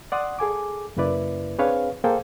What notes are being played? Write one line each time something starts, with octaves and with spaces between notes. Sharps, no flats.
D5 F#5 C6 D#6
G#4 A4 G#5 D6
F#2 C#3 A#3 E4 B4 D5
C4 D4 G#4 B4 C#5 F5
A#3 G#4 A4 C5 F5 G5